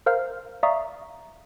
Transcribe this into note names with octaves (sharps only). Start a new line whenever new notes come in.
A#4 C5 F5 F6 G6
D5 E5 F5 A#5 C#6 D#6